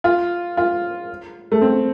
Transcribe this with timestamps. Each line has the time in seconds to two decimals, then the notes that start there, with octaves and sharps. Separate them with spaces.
0.04 F4
0.57 F4
1.52 A3
1.61 C4